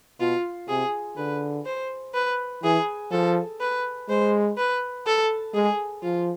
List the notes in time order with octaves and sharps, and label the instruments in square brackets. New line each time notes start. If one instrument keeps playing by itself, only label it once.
[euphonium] B2 [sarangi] F4
[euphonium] C3 [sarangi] G#4
[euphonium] D3 [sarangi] B4
[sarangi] C5
B4
[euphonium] E3 [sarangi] G#4
[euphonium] F3 [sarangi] A4
[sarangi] B4
[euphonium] G#3 [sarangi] C5
[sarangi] B4
A4
[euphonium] G#3 [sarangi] G#4
[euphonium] F3 [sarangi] F4